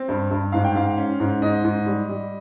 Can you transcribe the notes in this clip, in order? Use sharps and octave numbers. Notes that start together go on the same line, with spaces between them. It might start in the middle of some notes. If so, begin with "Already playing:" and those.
Already playing: C4
G2
G2
G#2 F5
G5
G#2 F5
C#4
G#2
G#2 D#5
G#2
G3
G3